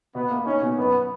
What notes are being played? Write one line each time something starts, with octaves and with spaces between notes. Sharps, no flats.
B2 B3
A#3
C#4 D#4
B2
F#2 B3